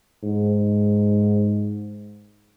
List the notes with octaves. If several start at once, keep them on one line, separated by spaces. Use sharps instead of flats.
G#2